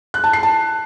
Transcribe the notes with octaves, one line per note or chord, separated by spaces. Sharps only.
F#6
A5
C7
A5